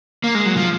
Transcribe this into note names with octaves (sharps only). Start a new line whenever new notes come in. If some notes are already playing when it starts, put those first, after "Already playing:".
A#3
G#3
F#3
F3